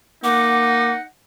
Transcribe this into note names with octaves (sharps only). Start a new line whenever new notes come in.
A#3 D#4 F#5 D6